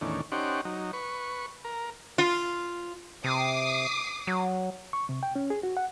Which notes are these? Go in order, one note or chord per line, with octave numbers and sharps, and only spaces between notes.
E2 A2 D#3 C#4 D4
C#4 D#4 G4 C5 D5 F#5
F#3 D#4
B4 C#6
A#4
F4
C3 D6 D#6 C7
F#3
C#6
C3
G5
C#4
G#4
F#4
F#5